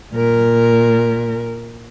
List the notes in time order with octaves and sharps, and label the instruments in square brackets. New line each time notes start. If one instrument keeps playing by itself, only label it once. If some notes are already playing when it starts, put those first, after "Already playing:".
[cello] A#2 A#4